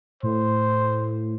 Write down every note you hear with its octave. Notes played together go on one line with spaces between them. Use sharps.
A2 C5